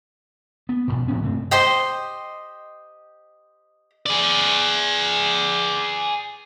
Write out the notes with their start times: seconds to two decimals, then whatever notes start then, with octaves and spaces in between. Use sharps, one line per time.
0.69 B3
0.88 F2 G#2 B2
1.08 A2 F3 B3 C#4
1.22 G2 C3 A3 C4
1.51 G4 C5 D#5 G5
4.06 G#4 D5